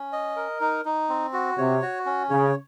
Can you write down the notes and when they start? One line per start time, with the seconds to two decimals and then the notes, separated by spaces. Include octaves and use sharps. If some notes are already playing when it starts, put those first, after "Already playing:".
Already playing: C#4
0.13 D#5
0.36 A#4
0.61 D#4
0.85 D#4
1.09 C4
1.33 F#4
1.58 C3 C#5
1.82 F#4
2.06 C#4
2.30 C#3 C#5